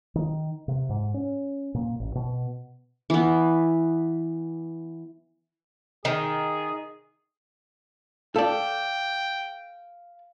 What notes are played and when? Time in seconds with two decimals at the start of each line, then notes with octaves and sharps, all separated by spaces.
0.15 D#3
0.68 C3
0.89 G#2
1.14 C#4
1.74 A#2
2.00 A1
2.15 B2
3.10 E3 B3
6.05 D#3 G#4
8.36 A4 D5 F5 G5